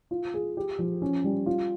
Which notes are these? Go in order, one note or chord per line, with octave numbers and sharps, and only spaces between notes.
F4
G#4
G4
F3
C#4
G3
F4